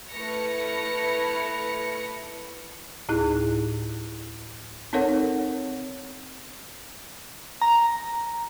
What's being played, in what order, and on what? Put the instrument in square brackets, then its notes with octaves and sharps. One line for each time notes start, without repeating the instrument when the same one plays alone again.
[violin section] A3 E4 B4 F6 A#6 C#7
[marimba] D2 A2 D#4 E4 G#4 F#6
C4 D#4 A4 A#4 C#5 F#5
[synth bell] A#5